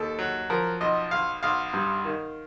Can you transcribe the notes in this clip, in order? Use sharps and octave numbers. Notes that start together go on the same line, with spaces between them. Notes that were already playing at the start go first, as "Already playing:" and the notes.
Already playing: D#2 A4
F#3
F3 A#4
B1 D#5
B1 F5
B1 F5
G2
D#3